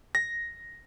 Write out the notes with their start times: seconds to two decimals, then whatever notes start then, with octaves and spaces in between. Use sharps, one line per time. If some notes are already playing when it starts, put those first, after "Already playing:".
0.15 A#6